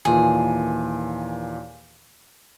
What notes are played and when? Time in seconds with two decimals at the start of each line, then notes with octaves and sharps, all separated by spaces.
0.05 D#2 A#2 E3 G#4